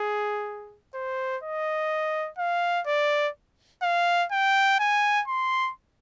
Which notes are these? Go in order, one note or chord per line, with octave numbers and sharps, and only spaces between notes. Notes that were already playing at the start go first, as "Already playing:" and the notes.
Already playing: G#4
C5
D#5
F5
D5
F5
G5
G#5
C6